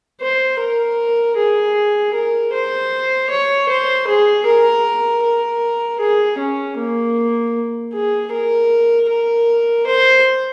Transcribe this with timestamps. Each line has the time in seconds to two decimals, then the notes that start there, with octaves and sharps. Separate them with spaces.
0.21 C5
0.60 A#4
1.37 G#4
2.14 A#4
2.53 C5
3.30 C#5
3.69 C5
4.07 G#4
4.46 A#4
5.23 A#4
6.00 G#4
6.39 C#4
6.77 A#3
7.94 G#4
8.32 A#4
9.09 A#4
9.87 C5